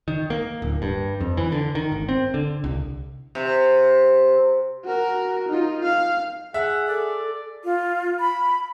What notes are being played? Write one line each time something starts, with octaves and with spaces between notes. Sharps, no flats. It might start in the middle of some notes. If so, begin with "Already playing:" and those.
D#3
A#3
D1
G2
F2
E3
D3
D#3
G#1
C4
D3
C2
C3
F#4 A#4
D#4 F4
F5
G#4 E5 F#5
A4 D5
F4
B5